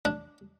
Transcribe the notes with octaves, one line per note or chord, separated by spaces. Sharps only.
D4